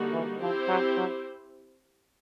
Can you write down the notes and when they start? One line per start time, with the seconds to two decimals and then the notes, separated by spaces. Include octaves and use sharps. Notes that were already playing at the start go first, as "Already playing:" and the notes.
Already playing: D3 G3 A#3 D#4 F#4
0.12 E3
0.41 F3 C4 E4 G4 C5
0.68 F#3
0.97 F#3